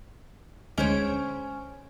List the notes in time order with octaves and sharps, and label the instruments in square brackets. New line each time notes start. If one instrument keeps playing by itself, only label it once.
[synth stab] D2 G#3 D7 [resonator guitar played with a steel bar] C#4 C5 C#5